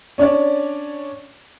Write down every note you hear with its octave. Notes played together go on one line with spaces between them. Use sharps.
C#4 D4 C#5 D5